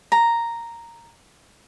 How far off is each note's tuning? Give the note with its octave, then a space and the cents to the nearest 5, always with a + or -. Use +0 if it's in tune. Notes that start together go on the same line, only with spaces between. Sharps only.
A#5 -5